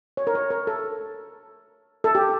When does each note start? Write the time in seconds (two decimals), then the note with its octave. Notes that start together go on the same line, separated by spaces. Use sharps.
0.17 C#5
0.27 A#4
0.35 C#5
0.50 A#4
0.67 A4
2.04 A4
2.15 G4